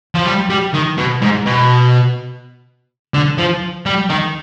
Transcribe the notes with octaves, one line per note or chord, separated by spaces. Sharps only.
F3
G3
G3
D#3
B2
G#2
B2
D3
F3
G3
D#3